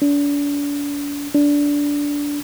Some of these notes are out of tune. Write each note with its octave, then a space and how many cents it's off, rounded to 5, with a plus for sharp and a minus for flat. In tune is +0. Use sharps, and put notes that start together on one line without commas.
D4 -40
D4 -20